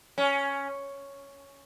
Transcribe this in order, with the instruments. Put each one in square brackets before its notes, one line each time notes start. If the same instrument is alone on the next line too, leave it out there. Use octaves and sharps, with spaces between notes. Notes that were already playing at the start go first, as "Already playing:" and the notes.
[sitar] C#4